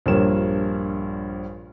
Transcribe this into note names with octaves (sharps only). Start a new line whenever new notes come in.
A#1 G2 G3 A#4 C#5 E7